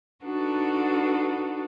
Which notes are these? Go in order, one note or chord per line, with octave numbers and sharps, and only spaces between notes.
D4 D#4 F#4 A4 B4